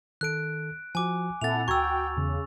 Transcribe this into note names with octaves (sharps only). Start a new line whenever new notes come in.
D#3 A4 F#6 D7
F3 F#4 G#5 D6
A#2 C4 E4 A4 F#5 A6 F7
D2 F#4 G5 A#5 C#6 E6 G#6
E2 C#3